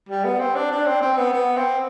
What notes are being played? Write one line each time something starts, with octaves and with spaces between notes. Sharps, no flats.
G3
B3
C4
D4
D4
C4
C4
B3
B3
C4